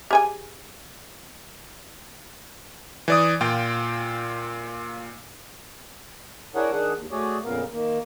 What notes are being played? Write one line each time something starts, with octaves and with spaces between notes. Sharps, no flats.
G4 G#4 G#5
E3 D5 D#6
A#2 F4 G5
D4 E4 G#4 A#4 C#5 F#5
D#3 D4 G#4 F#5
D#2
A3 F#4 G#4 C#5 D5
F2 A#2 C#3 B3 A#4 F5
D#3 A#3